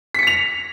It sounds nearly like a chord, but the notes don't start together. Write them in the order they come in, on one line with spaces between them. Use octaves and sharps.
B6 C#7 A#6 F7